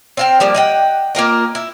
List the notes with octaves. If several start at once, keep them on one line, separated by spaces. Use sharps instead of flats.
C4 F5 G5
F3 G3 A#3
D#5 F#5 G5
A#3 F4 A#4 D#5
E4